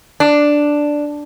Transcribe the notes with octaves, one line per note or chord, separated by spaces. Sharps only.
D4